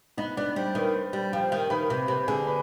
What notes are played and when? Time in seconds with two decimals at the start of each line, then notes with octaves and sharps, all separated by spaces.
0.17 B3 D#4 D#5
0.37 B3 D4 D5
0.56 G3 C5
0.75 D#3 B4
0.94 C5
1.13 G3
1.32 F3 G4 G5
1.52 D#3
1.70 D#3 B4 B5
1.90 C3 B4 B5
2.08 C3 B4 B5
2.28 D3 G#4 G#5
2.47 B4 B5